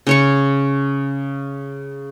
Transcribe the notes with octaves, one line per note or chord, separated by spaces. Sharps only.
C#3 C#5 C#6